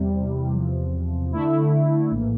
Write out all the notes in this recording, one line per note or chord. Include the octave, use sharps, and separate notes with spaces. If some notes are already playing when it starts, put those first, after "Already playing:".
Already playing: E2 C3 G3
E2 C3 F3
D3 A3 E4
A#1 A2 E3 A#3